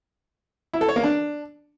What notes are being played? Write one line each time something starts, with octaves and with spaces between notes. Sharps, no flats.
E4
A4
C#5
A#3
D4